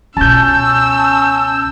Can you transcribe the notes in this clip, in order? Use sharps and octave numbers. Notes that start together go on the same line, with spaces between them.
C#2 B2 C#4 A5 E6 G6